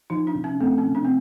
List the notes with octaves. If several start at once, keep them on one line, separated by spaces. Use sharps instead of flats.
F3 D#4
D4
C3
C#4
A3 C4
C#4
C3
D4
C4